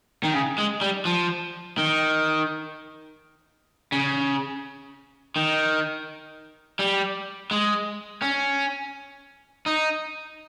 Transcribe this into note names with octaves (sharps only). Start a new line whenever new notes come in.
D#3
C#3
G#3
G3
F3
D#3
C#3
D#3
G3
G#3
C#4
D#4